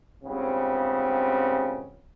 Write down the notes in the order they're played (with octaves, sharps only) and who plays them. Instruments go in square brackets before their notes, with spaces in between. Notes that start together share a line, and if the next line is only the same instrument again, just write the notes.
[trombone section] C#2 G2 C#3 B3 C4